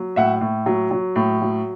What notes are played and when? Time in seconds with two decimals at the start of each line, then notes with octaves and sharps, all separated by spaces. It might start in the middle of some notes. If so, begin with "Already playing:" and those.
Already playing: F#3
0.16 A2 E5 F#5
0.41 A2
0.66 F#3
0.91 F#3
1.16 A2
1.41 F#3